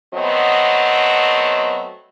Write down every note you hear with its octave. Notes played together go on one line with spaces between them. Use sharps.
F#3 A3 B3 C4 D#5